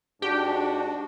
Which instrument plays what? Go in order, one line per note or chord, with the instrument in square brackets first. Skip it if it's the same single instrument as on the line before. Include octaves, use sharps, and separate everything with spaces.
[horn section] G#2 F#4 [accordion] D4 [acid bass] G4